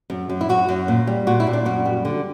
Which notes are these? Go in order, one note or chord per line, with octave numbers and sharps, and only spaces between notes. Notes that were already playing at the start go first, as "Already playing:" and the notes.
F#2
F#2
E4
F#2 F#4
F#2
A#2
G3
A#2 F#4
E4
A#2
D4
F#2 F#4
G3
D3